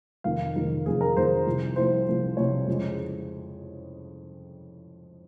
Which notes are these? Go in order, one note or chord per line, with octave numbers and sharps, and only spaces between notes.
F1 F2 D#3 F5
F1 F2 D#3
F1 F2 D#3 G#4
A#4
F1 F2 D#3 C5
C2 C3 F3
C2 C3 F3 C5
C2 C3 F3
C2 C3 F3 C#5
F2 C#3 G#3